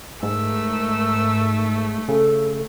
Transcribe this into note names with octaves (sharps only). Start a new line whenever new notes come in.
G#2 A3 A#4 E6
C#3 A4